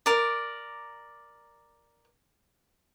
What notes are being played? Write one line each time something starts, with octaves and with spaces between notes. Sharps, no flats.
A#4 D5